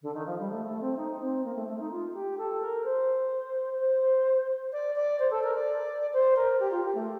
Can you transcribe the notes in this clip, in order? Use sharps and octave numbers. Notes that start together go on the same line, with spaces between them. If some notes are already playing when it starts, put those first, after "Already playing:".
D3
D#3
F3
G3
A3
A3
C4
D#4
C4
A#3
A3
A3
D#4
F4
G4
A4
A#4
C5
C5
D5
D5
C5
A4
A#4
D5
C5
A#4
G4
F4
G4
A3